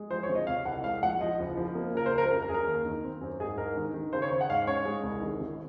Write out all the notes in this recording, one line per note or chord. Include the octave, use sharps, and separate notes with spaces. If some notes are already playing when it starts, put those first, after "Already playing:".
Already playing: G#3
F3 C5
C#5
G#1
D#5
C3 F5
C2 F#5
G#3 F5
A#1 F#5
F3 D#5
F#1
F3
A#3
C#3 A#4
C5
C#2
A#4
F#2 A#4
A#4
F#2 G#4
A#4
D#2
D#3
C4
F#2
G#2 G#4
G#2 A#4
D#3
D#3
C#3 C5
C#5
C#3
F#5
G#2 F5
C#4 C#5
G#3
C2
D#3
G#1